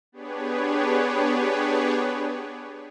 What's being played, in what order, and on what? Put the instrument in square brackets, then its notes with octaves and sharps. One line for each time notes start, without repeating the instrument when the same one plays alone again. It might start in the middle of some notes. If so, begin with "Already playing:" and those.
[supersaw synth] B3 D4 G4 G#4 B4 C#5